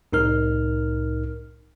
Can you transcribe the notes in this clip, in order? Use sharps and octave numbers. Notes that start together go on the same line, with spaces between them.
C2 A2 D#4 A#4 F6